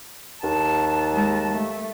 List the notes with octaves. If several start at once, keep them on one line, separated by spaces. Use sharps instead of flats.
D#2 A5
G#3 A5
A3